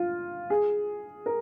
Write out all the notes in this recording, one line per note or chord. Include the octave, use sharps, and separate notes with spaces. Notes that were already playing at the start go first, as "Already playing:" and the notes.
Already playing: F4
G#4
A#4